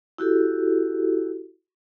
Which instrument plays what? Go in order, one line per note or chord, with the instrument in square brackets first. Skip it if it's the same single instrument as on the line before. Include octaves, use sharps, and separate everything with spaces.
[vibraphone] E4 F#4 G4 A4